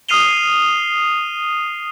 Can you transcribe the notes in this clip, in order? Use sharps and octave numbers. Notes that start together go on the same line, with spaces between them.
D#6 F6 C7 D#7 F7 G7